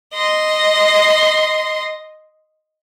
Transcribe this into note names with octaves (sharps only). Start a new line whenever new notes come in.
D#5 C6